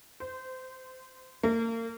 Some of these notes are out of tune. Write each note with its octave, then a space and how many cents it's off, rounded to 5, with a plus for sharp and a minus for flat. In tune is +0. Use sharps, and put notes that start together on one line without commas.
C5 -20
A#3 -35